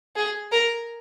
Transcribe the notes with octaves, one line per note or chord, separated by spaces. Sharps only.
G#4
A#4